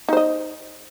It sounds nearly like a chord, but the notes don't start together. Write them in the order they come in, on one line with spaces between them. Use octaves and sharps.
D#4 C5 D#5